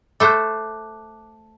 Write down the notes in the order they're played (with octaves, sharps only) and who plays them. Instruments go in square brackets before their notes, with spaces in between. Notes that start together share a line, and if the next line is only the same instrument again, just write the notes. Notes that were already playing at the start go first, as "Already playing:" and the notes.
[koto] A3 C5 [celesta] D6 F#6